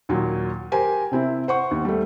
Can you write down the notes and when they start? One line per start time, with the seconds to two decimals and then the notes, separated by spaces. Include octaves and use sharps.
0.09 D#2 A#2 F#3
0.72 G4 A#4 C5 G#5
1.11 C3 C4 E4
1.48 C5 F#5 C#6
1.71 D#2
1.85 G3 A3